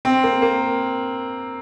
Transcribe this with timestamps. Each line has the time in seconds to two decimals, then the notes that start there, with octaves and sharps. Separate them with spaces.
0.05 C4
0.23 A#3
0.42 A#3